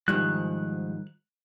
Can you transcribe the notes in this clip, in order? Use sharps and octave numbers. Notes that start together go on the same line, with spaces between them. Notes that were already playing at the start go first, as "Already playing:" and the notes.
G#2 D#3 F3 G3 F#6